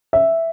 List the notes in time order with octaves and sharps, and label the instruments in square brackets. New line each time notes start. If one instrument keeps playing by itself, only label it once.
[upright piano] E5